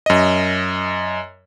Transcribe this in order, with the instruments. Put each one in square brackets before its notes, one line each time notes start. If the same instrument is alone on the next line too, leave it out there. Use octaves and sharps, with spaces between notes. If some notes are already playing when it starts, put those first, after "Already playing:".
[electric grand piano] F#2 D#5